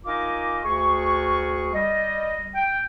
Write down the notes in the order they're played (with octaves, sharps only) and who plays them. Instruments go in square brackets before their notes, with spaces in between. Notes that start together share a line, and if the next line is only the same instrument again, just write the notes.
[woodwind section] D#4 F4 A#4 D#5 G#5 D6
D2 G#4 C#6
G3 D#5
G5